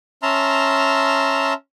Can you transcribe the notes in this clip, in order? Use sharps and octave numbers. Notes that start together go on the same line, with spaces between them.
C#4 E5 A5 A#5 C6 F6